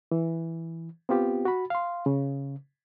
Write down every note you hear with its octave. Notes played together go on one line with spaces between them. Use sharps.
E3
B3 C4 F4 G4
F#4 B5
F5 C6
C#3